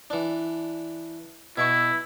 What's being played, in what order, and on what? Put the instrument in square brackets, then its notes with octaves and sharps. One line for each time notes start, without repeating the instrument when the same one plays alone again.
[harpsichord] E3 D4
[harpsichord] B2 E5 C#6 [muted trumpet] E4